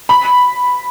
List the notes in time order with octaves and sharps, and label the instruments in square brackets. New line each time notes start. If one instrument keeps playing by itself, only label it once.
[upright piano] B5